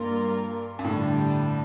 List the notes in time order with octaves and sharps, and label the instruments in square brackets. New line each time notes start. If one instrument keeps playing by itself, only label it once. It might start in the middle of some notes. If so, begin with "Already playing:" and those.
Already playing: [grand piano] G2 [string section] G3 A#3 F4 A#4
[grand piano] G2
[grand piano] A2 [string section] D3 G3 D4